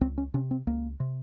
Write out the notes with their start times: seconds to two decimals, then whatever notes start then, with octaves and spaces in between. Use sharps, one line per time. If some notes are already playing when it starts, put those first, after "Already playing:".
0.01 C#2 C4
0.18 C#4
0.34 C3 C#4
0.51 C4
0.67 C#2 A#3
1.00 C3